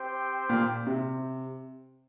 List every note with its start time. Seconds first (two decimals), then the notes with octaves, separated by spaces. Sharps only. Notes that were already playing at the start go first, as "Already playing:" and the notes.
Already playing: C4 G4 C5 G5
0.49 A#2
0.87 C3